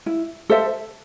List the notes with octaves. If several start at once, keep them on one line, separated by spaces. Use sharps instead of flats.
E4
A4 C5 E5